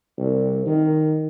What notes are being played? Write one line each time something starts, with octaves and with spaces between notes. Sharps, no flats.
C2
D#3